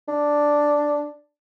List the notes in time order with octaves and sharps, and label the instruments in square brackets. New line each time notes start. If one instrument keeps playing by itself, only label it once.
[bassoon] D4